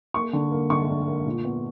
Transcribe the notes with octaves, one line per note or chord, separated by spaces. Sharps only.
A#3 C#6
D3
A#3
D3 C#6
D4
A#3
A#2
B3